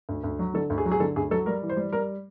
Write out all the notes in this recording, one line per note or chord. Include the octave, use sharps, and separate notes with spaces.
D2
D2
F#3
D3 A4
D2
G#4
F#3
G#4
D3 A4
D2 G#4
F#3 A4
G3 A#4
E3
C5
G3
G3 A#4